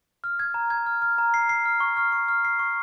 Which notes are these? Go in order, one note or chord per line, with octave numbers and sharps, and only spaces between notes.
F6
G#6
A#5
G#6
F6
F6
A#5
C7
C7
F6
C#6
F6
C#6
F6
C7
C#6